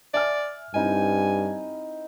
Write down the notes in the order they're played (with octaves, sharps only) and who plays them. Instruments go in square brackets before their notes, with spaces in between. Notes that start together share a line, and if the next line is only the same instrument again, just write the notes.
[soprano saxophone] D5 [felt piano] E5 G#5 F6
[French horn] G2 [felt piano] C4 D#4 E4 [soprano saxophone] G#5